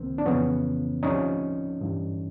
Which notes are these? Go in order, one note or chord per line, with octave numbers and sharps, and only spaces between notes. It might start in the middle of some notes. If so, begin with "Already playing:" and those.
Already playing: C#2 C3 D#3 A#3 C4
D4
F2 C#3 E3 B3 C#4
D2 C3 F3 C#4 D#4
G2 E3